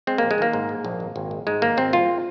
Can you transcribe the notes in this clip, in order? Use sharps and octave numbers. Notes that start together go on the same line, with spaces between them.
G#3 C4
A#1 A#3
G#3
D#3 A#3
G#2
G#3
A#1
G#1
G#1
G#3
G#2 G#3
G#1 A#3
G#1 C4
C2 F4